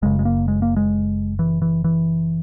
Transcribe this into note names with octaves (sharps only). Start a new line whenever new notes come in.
F#1 F#2 C#3 G#3
G#3
A#3
G#3
A#3
G#3
E3
E3
E3